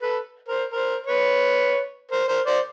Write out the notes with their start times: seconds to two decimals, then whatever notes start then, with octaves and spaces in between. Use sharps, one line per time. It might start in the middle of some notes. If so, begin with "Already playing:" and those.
0.02 A4 B4
0.48 A#4 C5
0.72 A#4 C5
1.06 B4 C#5
2.11 A#4 C5
2.28 A#4 C5
2.46 C5 D5